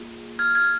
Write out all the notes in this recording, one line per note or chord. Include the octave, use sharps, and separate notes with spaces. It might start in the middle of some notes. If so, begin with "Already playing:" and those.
Already playing: A#3 F4 G#4
F6 G#6
F6 G#6